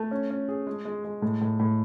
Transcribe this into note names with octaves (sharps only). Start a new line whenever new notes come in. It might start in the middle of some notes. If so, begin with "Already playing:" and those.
Already playing: A3
C#4
C#4
G#4
G#3
G#3
G#3
A2
A2
A2